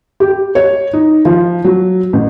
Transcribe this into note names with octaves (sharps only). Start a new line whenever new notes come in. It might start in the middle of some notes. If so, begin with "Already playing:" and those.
G4
C#5
D#4
F3
F#3
A1